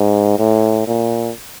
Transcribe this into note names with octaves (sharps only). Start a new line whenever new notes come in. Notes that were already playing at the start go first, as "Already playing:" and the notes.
Already playing: G#2
A2
A#2